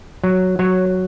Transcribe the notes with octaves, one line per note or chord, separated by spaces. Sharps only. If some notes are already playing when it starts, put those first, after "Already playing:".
F#3
F#3 C#5